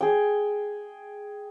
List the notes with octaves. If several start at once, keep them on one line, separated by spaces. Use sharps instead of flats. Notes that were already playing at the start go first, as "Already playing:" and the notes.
G#4 G5